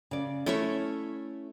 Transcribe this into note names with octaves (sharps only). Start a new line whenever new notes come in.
C#3 D5
A3 C#4 E4 C#5 E5